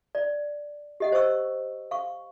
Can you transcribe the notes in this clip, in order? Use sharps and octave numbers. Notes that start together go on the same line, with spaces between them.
D5
G4 D#5 F#5
C5 D#5 C#6 E6
F5 C#6